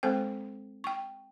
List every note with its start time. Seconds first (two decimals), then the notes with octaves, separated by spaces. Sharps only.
0.03 G#3 C4 A4 C5 G5
0.84 G5 C#6